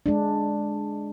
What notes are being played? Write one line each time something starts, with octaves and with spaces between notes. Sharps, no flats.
G#3 D4